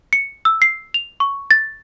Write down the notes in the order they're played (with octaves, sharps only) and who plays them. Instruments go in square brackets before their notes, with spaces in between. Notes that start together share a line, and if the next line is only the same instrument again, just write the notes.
[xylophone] C#7
E6
C7
F7
C#6
A6